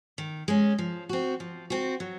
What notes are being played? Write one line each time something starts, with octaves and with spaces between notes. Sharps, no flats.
D#3
G#3 C#4
F3
C4 F#4
F3
C4 F#4
F#3